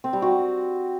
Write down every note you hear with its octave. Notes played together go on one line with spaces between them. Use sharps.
C4
G3
F#4